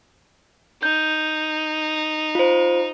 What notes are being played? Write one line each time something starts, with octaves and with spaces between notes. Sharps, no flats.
D#4 G6
F4 C5